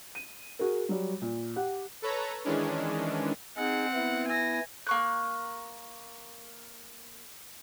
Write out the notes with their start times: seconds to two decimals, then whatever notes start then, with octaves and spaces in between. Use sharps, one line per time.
0.15 D#7
0.59 F#4 G#4 A#4
0.89 F#3 G3
1.22 A#2
1.56 G4 F#5
2.02 A4 B4 C#5 A#5
2.45 D#3 E3 G#3 C#4 D4
3.58 C4 D#4 G#4 F#5
3.94 B3 E4
4.28 G#5 A#6
4.87 A#3 C#6 F#6